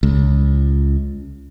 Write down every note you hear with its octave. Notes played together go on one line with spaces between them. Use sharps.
C#2